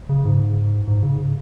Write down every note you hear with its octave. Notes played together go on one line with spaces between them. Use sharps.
C#3
G#2
G#2
C#3